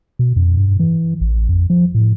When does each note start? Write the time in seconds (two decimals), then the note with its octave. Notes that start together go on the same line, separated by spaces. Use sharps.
0.19 B2
0.36 F2
0.57 G2
0.79 E3
1.21 A1
1.49 F2
1.70 F3
1.95 A2